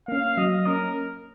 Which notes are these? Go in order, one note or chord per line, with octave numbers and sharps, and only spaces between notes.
A#3 C#4 F5
F#3 D#5
A#3 C#4 A#4